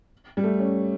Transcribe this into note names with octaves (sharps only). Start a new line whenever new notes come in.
G3
A3
C#4